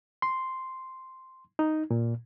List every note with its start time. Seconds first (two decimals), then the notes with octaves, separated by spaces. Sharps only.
0.22 C6
1.59 D#4
1.90 A#2